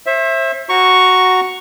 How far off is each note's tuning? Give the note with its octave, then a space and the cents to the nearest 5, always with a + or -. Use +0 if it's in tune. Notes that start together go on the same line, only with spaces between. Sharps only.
C5 +40 E5 +0
F#4 +0 A#5 +0 C#6 +0